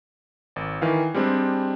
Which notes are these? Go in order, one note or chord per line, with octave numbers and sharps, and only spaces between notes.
G#1 D5
D#3 E3 F5
G3 G#3 C4 D4